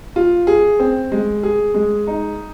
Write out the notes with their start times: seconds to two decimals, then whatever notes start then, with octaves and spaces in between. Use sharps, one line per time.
0.16 F4
0.47 G#4
0.79 C4
1.12 G#3
1.43 G#4
1.74 G#3
2.07 D#4